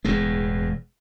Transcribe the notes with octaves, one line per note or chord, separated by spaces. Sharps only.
E1 E2 A2 G#3